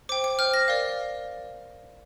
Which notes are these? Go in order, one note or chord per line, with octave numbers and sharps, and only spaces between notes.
C5 G5 D6
D6
C5 G5 F6
A#6
A#4 D5 F5